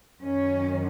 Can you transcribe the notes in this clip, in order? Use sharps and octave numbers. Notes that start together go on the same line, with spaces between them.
F#2 D#3 C#4